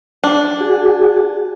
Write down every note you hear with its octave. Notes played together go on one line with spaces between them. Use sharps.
D4
F#4 G#4